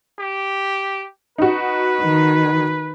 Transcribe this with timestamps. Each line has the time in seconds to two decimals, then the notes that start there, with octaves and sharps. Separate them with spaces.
0.19 G4
1.38 D#4 F#4 B4
2.01 D#3